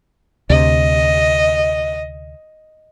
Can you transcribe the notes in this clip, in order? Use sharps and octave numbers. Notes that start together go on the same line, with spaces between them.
D2 C3 D#5